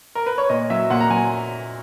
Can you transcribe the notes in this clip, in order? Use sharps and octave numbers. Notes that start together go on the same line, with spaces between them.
A#4
B4
C#5
A#2 D#5
F#3 E5
A#2 F#5
A#5
F#3 G#5